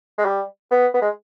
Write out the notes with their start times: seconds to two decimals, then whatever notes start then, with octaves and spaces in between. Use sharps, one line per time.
0.18 G#3
0.25 G3
0.71 B3
0.94 B3
1.02 G#3